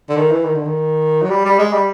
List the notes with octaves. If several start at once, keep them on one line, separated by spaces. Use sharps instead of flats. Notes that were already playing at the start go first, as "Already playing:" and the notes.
D3
D#3
E3
D#3
D3
D#3
F#3
G3
G3
G#3
G3